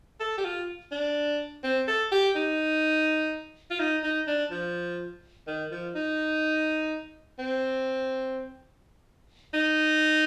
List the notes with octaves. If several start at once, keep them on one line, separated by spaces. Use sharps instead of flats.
A4
G4
F4
D4
C4
A4
G4
D#4
F4
D#4
D#4
D4
F3
D#3
F3
D#4
C4
D#4